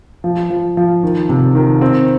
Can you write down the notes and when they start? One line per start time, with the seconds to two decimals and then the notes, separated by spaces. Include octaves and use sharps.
0.24 F3
0.50 F3
0.77 F3
1.03 D#3
1.29 C3
1.55 D#3
1.81 C4